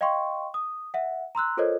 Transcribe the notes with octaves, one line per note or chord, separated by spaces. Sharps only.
D#5 F5 G5 C6 C#6
D#6
E5 F#5
A#5 C6 E6 F#6
F4 A4 A#4 C5 C#5 D#5